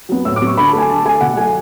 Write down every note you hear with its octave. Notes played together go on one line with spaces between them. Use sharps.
F#3 B3
A2 E6
D6
F#3 B3
C#6
D3 B5
A5
A3
G#5
D3 A5
A3 G#5
B2 F#5
F#3 A3 G#5